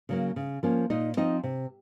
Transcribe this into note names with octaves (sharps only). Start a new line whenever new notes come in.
C#3 F#3 A#3
C#3
F3 A#3 C#4
A#2 D#4 D#5
F3 C4 D#4 D#5
C3